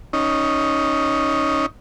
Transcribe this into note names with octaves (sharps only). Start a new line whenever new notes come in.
C#4 D#4